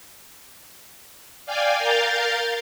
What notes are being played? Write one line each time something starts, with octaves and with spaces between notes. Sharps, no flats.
D5 F5 G5 G#5
A#4 F5 F6 G6 A6